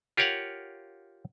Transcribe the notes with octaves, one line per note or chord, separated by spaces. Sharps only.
F4 G4 A#4 C#5 F5 F#5